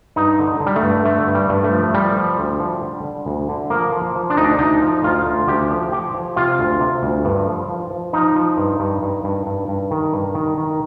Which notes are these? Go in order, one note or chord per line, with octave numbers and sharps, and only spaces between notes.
G2 D#4
D3
D3
G3
A3
G2
D3 A3
G2
G3
G2
A3
F3
F3 G3
F3
D2
F3
D3
D3
D2
D3
F3 A#3
F3
F3
D4
D2 D#4
D4
D2 D#4
F3
D2 F4
D2
D2 G4
F3
F3 G4
F3
C3 F4
D2
C3
D2
G2
F3
F3
F3
F3 D#4
F3
G2
G2
G2
G2
G2
G2
D#3
G2
D#3
D#3